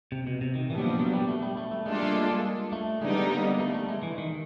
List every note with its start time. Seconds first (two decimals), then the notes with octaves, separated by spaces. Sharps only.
0.12 C3
0.27 B2
0.41 C3
0.55 D#3
0.70 A#2 E3 G3 B3 D4
0.78 F#3
0.84 F3
0.99 F#3
1.13 G3
1.28 A3
1.42 G3
1.57 A3
1.71 A3
1.86 G3 G#3 A#3 D4 F4 A4
2.03 A3
2.15 G#3
2.73 A3
3.01 D3 G3 G#3 B3 D#4
3.31 A#3
3.59 A3
3.74 A3
3.89 G#3
4.03 E3
4.18 D#3